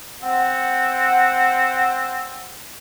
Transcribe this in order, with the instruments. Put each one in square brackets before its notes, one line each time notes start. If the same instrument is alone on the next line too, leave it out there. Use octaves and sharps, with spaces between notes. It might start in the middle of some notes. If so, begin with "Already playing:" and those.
[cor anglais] C4 [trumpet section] F#5